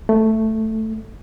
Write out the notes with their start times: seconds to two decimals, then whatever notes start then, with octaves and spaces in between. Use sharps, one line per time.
0.09 A3